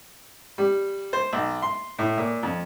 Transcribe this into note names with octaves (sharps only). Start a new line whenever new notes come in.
G3
C5
B1
C6
A2
A#2
F2